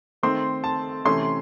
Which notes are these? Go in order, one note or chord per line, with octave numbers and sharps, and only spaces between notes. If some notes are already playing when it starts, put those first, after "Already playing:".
D#3 A3 C4 C6
A5
C3 E3 A3 C#4 C6